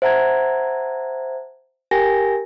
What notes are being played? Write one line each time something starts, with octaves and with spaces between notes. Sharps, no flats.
C5 E5 F#5 A5 A#5 G#6
G4 A#4 G5 G#5 A#6